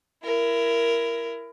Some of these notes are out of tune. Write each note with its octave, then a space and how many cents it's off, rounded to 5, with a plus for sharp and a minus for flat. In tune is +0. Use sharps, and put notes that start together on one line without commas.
E4 +25 A#4 +5